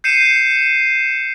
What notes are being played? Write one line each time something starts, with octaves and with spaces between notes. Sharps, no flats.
G6 C7 C#7 D#7 E7